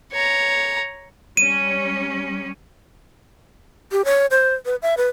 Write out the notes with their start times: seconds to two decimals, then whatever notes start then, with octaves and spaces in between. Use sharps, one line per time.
0.12 C#5 A#5
1.37 G3 C#4 D#7
3.92 G4
4.05 C#5
4.31 C5
4.66 B4
4.82 E5
4.97 B4